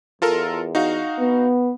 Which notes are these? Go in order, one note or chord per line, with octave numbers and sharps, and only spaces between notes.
E2 F4 A4 A#4
D#4 F#4 F5
B3